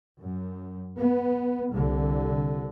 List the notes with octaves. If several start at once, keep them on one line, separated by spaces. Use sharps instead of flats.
F#2
B3
C2 D3